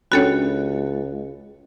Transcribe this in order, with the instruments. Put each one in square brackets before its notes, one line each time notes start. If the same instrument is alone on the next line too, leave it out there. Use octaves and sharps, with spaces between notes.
[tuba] C#2 [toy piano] C#4 D4 B5 [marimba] F#4 A4 C#5